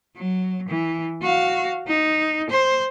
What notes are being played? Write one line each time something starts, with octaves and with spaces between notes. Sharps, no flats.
F#3
E3
F#4 F5
D#4
C5